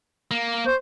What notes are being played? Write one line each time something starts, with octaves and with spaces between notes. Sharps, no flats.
A#3
C5 C#6 G6